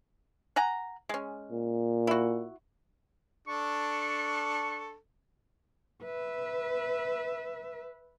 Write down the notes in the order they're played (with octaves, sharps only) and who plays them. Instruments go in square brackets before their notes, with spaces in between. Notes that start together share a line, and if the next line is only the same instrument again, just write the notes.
[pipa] F#5 G#5 A#5
G#3 C#4
[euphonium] A#2
[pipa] E4 F#4
[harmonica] D4 A4 [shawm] C#6
[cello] B4 E5